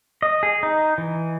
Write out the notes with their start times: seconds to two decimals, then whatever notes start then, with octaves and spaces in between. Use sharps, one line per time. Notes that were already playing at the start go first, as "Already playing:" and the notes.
0.22 D#5
0.43 G#4
0.63 D#4
0.98 E3